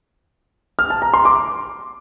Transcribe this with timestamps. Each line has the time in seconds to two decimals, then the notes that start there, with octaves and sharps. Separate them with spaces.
0.79 F6
0.90 A5
1.02 A#5
1.14 C6
1.25 D6